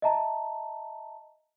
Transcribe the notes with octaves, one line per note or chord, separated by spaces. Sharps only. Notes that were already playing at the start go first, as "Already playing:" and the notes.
D#5 E5 A5 A#5